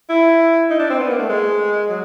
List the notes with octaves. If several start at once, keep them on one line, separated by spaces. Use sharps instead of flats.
E4
D#4
D4
C4
B3
A#3
A3
G#3
F#3